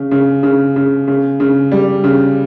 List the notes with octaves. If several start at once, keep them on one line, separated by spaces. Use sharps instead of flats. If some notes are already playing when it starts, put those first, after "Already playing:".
Already playing: C#3
C#3
C#3
C#3
C#3
C#3
G3
C#3